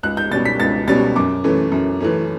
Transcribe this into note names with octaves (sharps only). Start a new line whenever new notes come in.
C#2 F#6
G6
B2 G3 C#4 A6
B6
C#2 A6
B2 G3 C#4 A6
F#2 D6
E3 A3 C#4
F#2
E3 A3 C#4